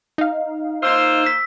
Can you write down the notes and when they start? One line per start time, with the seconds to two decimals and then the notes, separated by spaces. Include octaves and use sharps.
0.18 D#4 F5
0.83 A#3 F4 C5 E6
1.26 B6